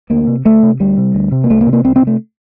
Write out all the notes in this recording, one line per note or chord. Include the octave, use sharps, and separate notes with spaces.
D2 A#3
C3
D2 A3
C3
D2 G3
C3
D2
C3
A#3
C2 A3
A#3
C3
A#3
C2 C4
C4
C3
A3